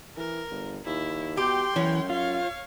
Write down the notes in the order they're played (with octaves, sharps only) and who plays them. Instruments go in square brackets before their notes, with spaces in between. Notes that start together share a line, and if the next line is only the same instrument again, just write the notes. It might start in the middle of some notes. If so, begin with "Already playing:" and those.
[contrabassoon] E3 [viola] A#4
[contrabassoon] G1
[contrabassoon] D#2 [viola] E4
[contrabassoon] B2 [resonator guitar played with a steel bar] G4 [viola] G5 C6
[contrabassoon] F#2 [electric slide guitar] E3 [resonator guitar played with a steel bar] C#4
[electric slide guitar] F4 [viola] C#5 F5